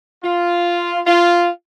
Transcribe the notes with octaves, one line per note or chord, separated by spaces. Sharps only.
F4
F4